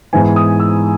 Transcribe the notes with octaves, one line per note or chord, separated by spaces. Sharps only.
G#2 E3 B3 G#5
D#6
E6